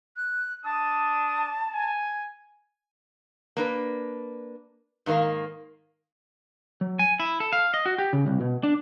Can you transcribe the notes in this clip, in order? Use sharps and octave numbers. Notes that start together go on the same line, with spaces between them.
F#6
D4 A5 D#6
G#5
A#3 D4 B4
G#2 D#3 A#3 A#4 F5
F#3
G#5
E4
A4
F5
D#5
F#4
G4
C#3
C2
B2
D4